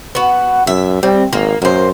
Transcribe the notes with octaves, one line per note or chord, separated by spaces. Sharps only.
B3 F#4
F#2 E5
G3 C4
G#1 A#3
F#2 A#3 C5